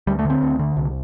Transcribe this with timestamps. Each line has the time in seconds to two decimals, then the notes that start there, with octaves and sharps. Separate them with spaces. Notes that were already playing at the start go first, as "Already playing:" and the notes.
0.07 D2 G3
0.19 A3
0.25 D3 C4
0.43 D2
0.59 D3
0.77 C2